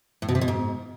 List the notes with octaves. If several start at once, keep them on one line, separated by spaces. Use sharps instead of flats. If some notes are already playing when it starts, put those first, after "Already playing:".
A2
B2
C3
B2
G#2